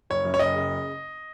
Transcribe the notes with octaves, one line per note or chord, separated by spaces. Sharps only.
F#1 C#5
F#2
C#5
F#1 D#5
C#3